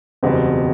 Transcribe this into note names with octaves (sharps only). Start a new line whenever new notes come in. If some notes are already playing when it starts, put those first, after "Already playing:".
F#1 E2 B2 G3 C4